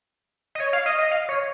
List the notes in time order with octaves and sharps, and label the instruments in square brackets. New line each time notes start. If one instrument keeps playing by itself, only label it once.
[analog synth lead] D#5
C#5
F5
D#5
D#5
F5
C#5